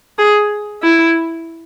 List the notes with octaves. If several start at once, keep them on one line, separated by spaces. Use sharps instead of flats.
G#4
E4